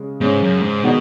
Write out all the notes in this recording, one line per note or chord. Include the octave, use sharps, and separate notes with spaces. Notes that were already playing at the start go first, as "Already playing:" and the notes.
Already playing: C#3 G#3 C#4
G#2 C#3 G#3 C#4
F#2
G#2
B2 D#3 G#3 D#4 F#4